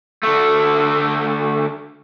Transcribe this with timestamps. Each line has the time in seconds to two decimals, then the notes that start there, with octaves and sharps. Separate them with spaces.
0.23 D3 A3